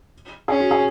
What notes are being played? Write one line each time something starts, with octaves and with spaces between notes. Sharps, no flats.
C#4 G#4
F#4
G#4